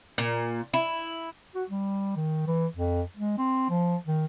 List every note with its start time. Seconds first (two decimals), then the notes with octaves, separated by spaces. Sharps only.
0.18 A#2
0.74 E4
1.55 F#4
1.69 G3
2.16 D#3
2.47 E3
2.76 F2
3.17 G#3
3.38 C4
3.69 F3
4.07 D#3